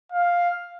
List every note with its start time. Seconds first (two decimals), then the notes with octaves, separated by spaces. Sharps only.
0.12 F5